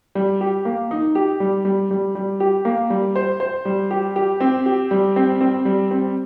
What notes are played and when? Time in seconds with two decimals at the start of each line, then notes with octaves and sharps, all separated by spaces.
0.15 G3
0.41 G4
0.65 A#3
0.91 D#4
1.15 G4
1.40 G3
1.65 G3
1.91 G3
2.15 G3
2.40 G4
2.65 A#3
2.90 G3
3.16 C5
3.40 C5
3.65 G3
3.91 G4
4.16 G4
4.40 C4
4.66 G4
4.91 G3
5.16 C4
5.41 C4
5.65 G3
5.91 C4